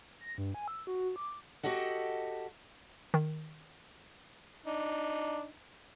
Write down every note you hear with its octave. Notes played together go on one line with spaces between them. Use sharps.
A#6
G2
G#5
E6
F#4
D6
F#4 G4 A4 D#5 F#5
D#3
D4 D#4